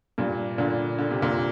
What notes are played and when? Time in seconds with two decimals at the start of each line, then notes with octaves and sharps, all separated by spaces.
0.18 G2 A#2
0.58 A#2 D3
0.98 D3
1.10 C3
1.22 A#2 D3